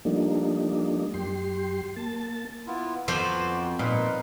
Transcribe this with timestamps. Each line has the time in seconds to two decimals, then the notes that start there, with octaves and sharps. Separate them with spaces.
0.05 F3 G3 A3 A#3 D4 D#4
1.14 F#2 G4 C6
1.96 A#3 A5
2.67 B3 E4 F4
3.08 F2 F3 B3 F#4 C5 D6
3.79 A#2 D#4 B4